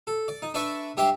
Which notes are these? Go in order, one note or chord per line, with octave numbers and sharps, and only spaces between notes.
A4
D5
D#4
D4 B4 D5 E5 B5 C#6
G2 G4 E5 G5 C6 D6